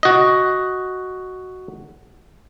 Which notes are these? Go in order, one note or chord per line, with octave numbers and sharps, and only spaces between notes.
F#4 D#5